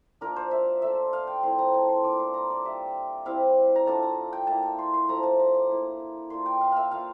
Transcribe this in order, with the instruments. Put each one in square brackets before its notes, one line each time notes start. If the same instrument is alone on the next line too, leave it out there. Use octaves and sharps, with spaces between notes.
[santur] A#3 D4 F4 A#4
C5
E5
A3 D4 F4 E5
F5
G5
A3 C4 E4 C6
A#5
A5
C6
A#3 D4 F4 D6
C6
A#5
D5
G3 D4 F4 E5
G3 C4 E4 F5
A#5
A3 D4 F4 A5
A#5
G5
A#3 E4 A5
A5
C6
C6
F3 A3 D4 A#5
A5
A#5
D6
A#3 E4
A#3 D4 F4 C6
G5
F5
E5 F5
A#3 F4 F5